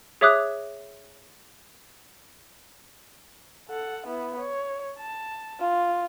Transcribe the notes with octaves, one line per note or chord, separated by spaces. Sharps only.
G#4 C#5 E5 D6 D#6 F#6
A4 F#5
B3 E4
C#5
A5
F4